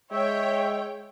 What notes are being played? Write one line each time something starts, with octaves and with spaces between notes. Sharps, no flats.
G#3 C#5 E5 G5